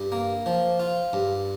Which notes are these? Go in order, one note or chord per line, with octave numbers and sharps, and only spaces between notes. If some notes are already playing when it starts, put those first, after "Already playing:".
Already playing: G2
A#3
F3
F4
G2